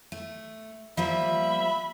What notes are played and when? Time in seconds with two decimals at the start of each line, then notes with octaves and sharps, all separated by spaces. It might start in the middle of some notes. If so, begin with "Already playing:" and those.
0.12 A3
0.97 F3 G3 A#3 E5 B5